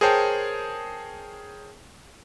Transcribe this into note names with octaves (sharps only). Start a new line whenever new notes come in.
G#4 A#4 C5 C#5 G5 A5